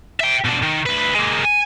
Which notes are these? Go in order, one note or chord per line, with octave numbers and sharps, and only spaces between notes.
E5 G5
B2 D4
D#3
D2 B4
G#3 A#3
G#5